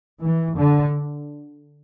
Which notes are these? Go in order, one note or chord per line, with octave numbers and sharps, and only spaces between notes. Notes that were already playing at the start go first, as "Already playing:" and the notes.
E3
D3